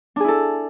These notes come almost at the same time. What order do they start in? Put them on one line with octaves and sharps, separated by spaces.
D4 G#4 E4 A4